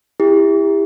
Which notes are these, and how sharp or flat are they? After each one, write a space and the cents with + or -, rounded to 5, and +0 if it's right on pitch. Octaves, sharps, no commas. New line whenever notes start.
E4 +0 G4 +35